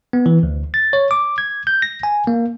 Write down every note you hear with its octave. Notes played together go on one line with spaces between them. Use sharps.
B3
E3
D2
A6
C#5
D6
G#6
G6
A#6
G#5
A#3